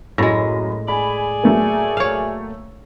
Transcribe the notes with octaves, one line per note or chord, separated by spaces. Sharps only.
F#2 A2 G#3 B5 A#6
G#4 D5 G#5 B5
F#3 A3 A#3
C#5 F5